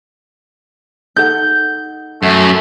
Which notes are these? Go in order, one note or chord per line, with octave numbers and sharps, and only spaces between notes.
D#4 A4 F#5 G6
F#2 A3